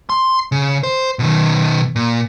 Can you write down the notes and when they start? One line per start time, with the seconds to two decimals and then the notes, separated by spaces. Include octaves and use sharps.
0.10 C6
0.52 C#3
0.83 C5
1.19 B2 D#3
1.96 A#2